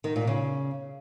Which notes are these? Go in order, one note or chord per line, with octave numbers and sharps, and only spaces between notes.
D#3
A#2
C#3